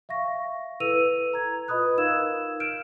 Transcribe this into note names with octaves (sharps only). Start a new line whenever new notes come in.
E5 F5 C#6 A#6
E4 A4 B4 E6 D#7 F7
A#5 G#6
F4 B4 D#5 B5 D#6 F#6
D#4 A#4 F5 E6 G#6 E7
F6 G6 D7 E7